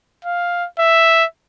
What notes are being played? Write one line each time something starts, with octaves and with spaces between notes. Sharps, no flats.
F5
E5